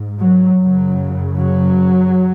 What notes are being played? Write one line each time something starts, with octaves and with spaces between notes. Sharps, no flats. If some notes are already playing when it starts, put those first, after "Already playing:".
Already playing: G#2
F#3
F#2 C#3 F#3
F#3